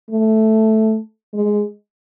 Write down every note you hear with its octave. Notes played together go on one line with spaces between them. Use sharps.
A3
G#3